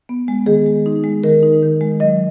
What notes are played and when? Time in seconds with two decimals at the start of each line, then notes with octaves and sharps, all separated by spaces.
0.09 B3
0.28 G#3
0.46 D#3 G#4
0.66 G#3
0.86 D#4
1.04 G#3
1.24 D#3 A#4
1.43 D#4
1.63 D#3
1.81 G#3
2.00 F#3 D#5